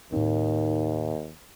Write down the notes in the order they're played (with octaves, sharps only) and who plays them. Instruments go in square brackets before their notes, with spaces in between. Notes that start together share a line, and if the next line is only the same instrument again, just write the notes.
[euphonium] D#2 [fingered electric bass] A2 C4 [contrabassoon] D#3